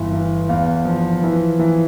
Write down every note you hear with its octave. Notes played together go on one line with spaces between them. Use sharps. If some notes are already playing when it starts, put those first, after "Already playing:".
Already playing: G1 E3
E3
E2 F5
F3
E3
E3